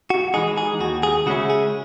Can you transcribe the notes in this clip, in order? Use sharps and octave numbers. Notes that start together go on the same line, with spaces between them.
F#4
E3 G#3 D#4 G#4
G#4
D#2 F#4
G#4
C#3 G#3 C#4 E4 F#4
G#4